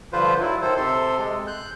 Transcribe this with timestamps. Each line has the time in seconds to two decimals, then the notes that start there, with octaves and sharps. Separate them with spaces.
0.13 G2 D3 F3 F4 B4 C5
0.40 F#3 E4
0.62 D#3 A4 C5
0.77 C3 A4 C6
1.19 G#3
1.47 F#6 G6